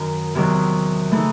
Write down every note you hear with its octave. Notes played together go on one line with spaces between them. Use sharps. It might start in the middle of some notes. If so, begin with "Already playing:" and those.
Already playing: F#2 D#3 D#4
E2 C3 D#3 F#3
C#3 E3 A3 D#4